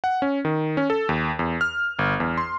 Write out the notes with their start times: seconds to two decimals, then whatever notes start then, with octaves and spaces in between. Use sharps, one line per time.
0.04 F#5
0.22 C#4
0.45 D#3
0.77 C#4
0.90 A4
1.09 D#2
1.39 E2
1.61 F6
1.99 G1
2.20 E2
2.38 C6